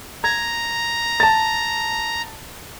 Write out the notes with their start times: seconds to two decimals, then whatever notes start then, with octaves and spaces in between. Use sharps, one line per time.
0.24 A#5 G#6
1.20 A5 A6